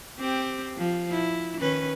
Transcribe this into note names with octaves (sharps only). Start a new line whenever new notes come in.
C4 G4
F3
E4
D#3 C#4 B4